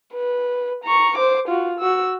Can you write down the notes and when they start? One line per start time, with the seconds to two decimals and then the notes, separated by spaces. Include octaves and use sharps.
0.14 B4
0.84 A#5 C#6
1.18 C5 D6
1.48 F4 F#4
1.79 F#4 E6